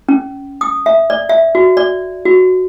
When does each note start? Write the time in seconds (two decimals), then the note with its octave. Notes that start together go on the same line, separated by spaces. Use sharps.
0.09 C#4
0.61 D#6
0.86 E5
1.10 D5
1.29 E5
1.55 F#4
1.77 D5
2.25 F#4